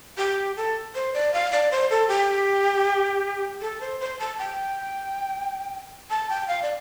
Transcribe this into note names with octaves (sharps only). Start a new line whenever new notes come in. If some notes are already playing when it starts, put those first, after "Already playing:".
G4
A4
C5
D5
F5
D5
C5
A4
G4
A4
C5
C5
A5
G5
A5
G5
F5
D5